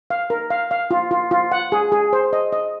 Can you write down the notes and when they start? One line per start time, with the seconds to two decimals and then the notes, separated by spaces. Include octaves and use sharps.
0.10 F5
0.30 A#4
0.50 F5
0.71 F5
0.91 F4
1.11 F4
1.31 F4
1.52 F#5
1.72 G#4
1.92 G#4
2.13 C5
2.33 D#5
2.52 D#5